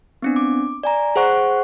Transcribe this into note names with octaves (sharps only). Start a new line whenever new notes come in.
B3 C4 D4
D6
D5 G#5 A#5
G#4 C5 F#5 C#6 F#6